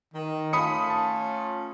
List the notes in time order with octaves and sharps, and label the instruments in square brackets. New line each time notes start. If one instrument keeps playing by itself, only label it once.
[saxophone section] D#3
[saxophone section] A3 C#4 F4 [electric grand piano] B5 D#6 C#7
[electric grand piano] A5